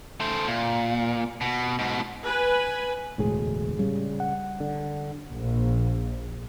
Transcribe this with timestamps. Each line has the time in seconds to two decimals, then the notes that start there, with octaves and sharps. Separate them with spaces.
0.20 A3 C5
0.47 A#2
1.41 B2
1.79 G#2 B2
2.24 B4 G#5
3.18 E1 D2 A2 G#3 G#4
3.79 C#3 G3
4.20 F#5
4.60 D3
5.34 A#1